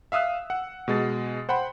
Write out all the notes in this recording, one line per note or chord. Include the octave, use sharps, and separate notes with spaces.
E5 F5 D#6 E6 F#6
F#5
B2 G#3 A6 C7
C5 F#5 G5 B5